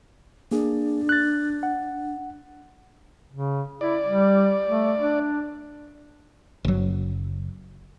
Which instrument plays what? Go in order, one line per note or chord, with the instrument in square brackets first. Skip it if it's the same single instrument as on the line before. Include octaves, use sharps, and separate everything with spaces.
[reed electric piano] A#3 G#4 [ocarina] D4
[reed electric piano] F#6 A6
F#5
[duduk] C#3
[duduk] E4 [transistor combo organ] D5
[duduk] G3
A3
D4
[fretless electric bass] F#1 F#3